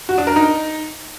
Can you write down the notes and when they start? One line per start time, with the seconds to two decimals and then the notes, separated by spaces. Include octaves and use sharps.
0.09 F#4
0.18 D4
0.27 A#4
0.36 D#4